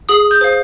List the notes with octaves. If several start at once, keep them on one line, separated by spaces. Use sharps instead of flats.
G#4 D#6
G6
C5 F5